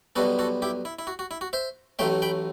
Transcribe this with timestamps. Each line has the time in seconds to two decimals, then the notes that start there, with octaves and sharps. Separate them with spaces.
0.16 B1 B2 G3 B3 F#4 A4
0.39 F#4 A4
0.62 E4 G4
0.85 E4
0.99 E4
1.07 F#4
1.19 F#4
1.31 E4
1.41 F#4
1.53 C5 E5
1.99 A1 A2 F#3 A3 E5 G5
2.22 G5 B5